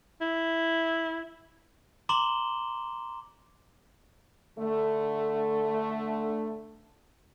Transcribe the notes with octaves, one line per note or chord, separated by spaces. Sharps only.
E4
A#5 C6 D6 E7 F#7 G7
D3 A3